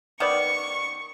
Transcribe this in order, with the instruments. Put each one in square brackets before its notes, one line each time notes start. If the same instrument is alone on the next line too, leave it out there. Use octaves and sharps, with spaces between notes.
[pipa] D#3 B3 D5 [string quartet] C#6